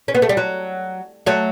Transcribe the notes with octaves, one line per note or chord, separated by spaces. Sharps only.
C#4
B3
A3
G3
F#3
F#3 A3